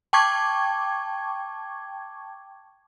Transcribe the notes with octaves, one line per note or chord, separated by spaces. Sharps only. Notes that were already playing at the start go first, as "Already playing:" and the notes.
G5 A5 C#6 D6 G#6